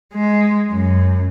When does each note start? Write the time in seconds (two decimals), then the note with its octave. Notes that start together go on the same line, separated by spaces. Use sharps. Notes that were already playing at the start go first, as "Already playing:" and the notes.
0.14 G#3
0.71 F#2